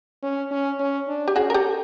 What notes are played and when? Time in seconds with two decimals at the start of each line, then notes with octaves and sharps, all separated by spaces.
0.23 C#4
0.51 C#4
0.79 C#4
1.08 D4
1.28 G4
1.36 C#4 F#4 G#4
1.50 A#4
1.54 G4 A4